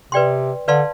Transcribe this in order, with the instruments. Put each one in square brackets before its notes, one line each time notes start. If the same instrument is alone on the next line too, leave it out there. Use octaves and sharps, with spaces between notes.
[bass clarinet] C3 [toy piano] B4 D5 G5 C6
[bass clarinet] D3 [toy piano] B4 D5 F5 A5 C6